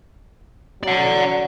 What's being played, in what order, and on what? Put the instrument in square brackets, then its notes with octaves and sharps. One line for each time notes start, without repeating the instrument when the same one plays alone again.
[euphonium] F#3 [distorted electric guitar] D5 F#5